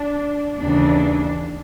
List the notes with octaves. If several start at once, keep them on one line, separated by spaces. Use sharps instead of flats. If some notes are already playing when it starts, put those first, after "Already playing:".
Already playing: D4
D#2 C#3 E3 D4